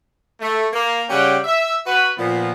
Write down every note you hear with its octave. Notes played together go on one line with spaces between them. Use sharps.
A3
A#3
C#3 G3 C#4 G4 F#5 G5
E5
F#4 B4
A#2 F3 B3